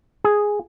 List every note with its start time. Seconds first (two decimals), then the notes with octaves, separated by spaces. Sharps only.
0.24 G#4